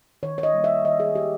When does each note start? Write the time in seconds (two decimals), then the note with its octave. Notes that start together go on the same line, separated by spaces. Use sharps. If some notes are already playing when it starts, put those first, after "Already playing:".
0.23 D#3 C#5
0.38 C#5
0.43 D#5
0.54 G3 A#3
0.64 E5
0.84 D#3 D#5
1.00 G#4
1.15 G3 A#3 G4